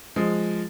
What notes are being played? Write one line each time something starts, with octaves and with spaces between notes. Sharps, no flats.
F3 G#3